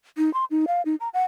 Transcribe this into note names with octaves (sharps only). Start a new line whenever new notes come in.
D#4
C6
D#4
F5
D#4
A#5
F#5